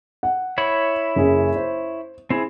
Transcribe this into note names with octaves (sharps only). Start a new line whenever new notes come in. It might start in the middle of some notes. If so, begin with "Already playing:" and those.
F#5
E4 C#5 B5
F#1 C#4 G#4
C5
C4 E4 G#4